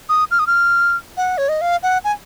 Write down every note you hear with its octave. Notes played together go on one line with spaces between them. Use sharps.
D#6
F6
D#6
F6
F#5
C#5
D#5
F5
F#5
G#5